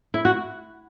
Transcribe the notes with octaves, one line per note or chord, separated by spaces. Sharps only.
E4
F#4